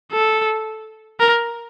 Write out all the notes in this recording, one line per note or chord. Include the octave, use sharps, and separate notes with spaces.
A4
A#4